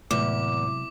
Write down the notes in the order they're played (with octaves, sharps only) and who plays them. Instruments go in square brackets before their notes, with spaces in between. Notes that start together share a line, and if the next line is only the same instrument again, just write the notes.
[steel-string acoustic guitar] E2 [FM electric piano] A2 [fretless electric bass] C3 F#3 G#3 [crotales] D6